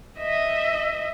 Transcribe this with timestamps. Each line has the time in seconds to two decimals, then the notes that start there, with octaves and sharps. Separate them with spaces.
0.19 D#5 E5